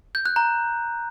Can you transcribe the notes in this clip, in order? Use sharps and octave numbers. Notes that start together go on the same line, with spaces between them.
G6
F#6
A#5